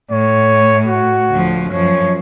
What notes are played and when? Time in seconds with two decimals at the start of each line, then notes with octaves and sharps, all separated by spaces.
0.11 A2 C#5
0.87 F#4
1.31 D2 F3
1.73 F#2 F3 C#5